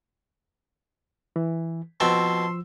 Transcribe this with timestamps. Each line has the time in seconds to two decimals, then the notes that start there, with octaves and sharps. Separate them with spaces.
1.36 E3
2.00 B2 F3 C4 A5 C6 E6